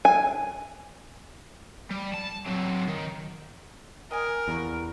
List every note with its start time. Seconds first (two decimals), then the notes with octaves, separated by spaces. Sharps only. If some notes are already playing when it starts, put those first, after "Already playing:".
0.05 G#5
1.91 G3
2.14 A5
2.46 F#3 C4
2.87 D#3
4.11 A#4 D#5 G5 G#5
4.48 E2 G3 A#3 F#4